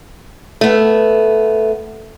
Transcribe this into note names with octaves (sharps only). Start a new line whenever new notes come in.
A3 B3